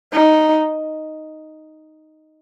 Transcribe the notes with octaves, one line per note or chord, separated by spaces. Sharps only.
D#4